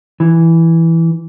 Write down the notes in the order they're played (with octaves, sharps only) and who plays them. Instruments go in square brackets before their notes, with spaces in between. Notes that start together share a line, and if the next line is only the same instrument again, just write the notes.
[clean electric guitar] E3